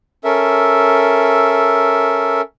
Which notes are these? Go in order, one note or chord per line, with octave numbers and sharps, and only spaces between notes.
C#4 A4 A#4 E5